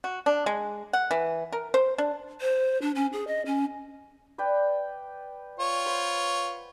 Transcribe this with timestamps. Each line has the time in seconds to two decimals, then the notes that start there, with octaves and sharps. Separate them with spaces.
0.04 F#4
0.26 D4
0.46 G#3
0.93 F#5
1.11 E3
1.52 A#4
1.74 C5
1.98 D4
2.41 C5
2.82 D4
2.95 C#4
3.13 G#4
3.27 D#5
3.46 C#4
4.38 B4 D5 G5
5.60 F4 C#5
5.86 B4 C5 F#5